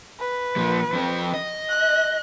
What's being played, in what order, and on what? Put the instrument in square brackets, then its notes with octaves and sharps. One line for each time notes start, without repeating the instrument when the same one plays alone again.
[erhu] B4
[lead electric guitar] A#2 F3
F2 C4
D#5
[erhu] F#6